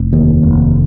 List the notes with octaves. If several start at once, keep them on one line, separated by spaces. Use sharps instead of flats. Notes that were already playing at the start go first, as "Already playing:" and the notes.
Already playing: F1
D#2
F1